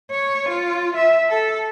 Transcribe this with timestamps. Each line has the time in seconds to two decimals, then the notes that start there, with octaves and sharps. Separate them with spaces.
0.11 C#5
0.49 F4
0.96 E5
1.29 A4